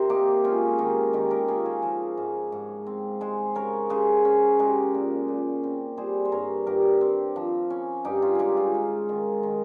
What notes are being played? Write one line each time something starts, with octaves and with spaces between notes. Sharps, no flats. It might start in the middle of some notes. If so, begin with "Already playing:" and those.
Already playing: C3 A#4 C5
A#3 D#4 G4
G#3 C#4 F4
D#3 D#4 G4
D#3 D#4 G4
G4 A#4
C#4 F4 G#4
G#4 C5
F3 G#4 C5
G#2
G#2
C4
G#3 G#4 C5
C#3 A#4 C#5
C#3 G#4 C5
C#4
G#3 G4 A#4
A#2
A#2
C4
G3 G#4 C5
C5
G2 A#4 C#5
G2 G4 A#4
C4
F3
C#4
G2 D#4 G4
C#4 F4
G#3 D#4 G4 G#4
F4 G#4
G#3
D#3
D#3